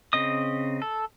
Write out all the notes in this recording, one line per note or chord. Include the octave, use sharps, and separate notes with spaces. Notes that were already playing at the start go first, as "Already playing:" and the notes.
C#3 C4 D#5 D#6
A4